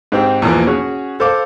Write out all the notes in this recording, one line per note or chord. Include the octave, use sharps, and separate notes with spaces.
G#2 C4 G4
E2 B2 E3 F3 A#3
C#4 F#4 G#4
A4 C5 F5 D6